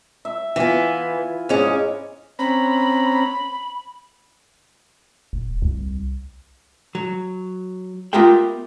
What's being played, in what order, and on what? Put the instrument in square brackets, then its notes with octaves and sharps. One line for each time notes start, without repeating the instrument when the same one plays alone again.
[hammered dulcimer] E5
[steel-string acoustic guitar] E3 B3 [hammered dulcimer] E4 F4 G#5
[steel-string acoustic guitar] G#2 C#4 [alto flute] G#4 [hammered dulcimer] D5
[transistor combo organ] C4 C#4 A#5 [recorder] B5
[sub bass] D#1
C2
[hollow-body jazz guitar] F#3
B3 F4 G4 A#4 E5 G5